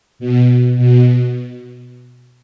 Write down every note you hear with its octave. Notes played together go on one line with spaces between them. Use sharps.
B2
B2